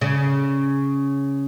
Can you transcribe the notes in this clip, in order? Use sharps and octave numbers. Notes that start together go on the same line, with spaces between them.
C#3